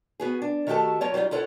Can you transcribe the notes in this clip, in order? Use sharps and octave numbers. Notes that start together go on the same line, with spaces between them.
B3 F#4 G#4
D4
D#3 A3 F#4 G4 A4 A5
F#3 F4 C#5
F#3 G3 D#4 F4
E4 F4 A4 C#5 F#5